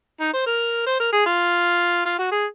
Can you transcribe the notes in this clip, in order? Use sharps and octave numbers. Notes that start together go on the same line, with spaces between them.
D#4
C5
A#4
C5
A#4
G#4
F4
F4
F#4
G#4